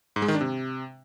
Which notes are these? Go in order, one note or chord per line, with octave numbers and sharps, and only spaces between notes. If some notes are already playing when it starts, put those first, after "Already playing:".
G#2
G#3
D#3
D4
C3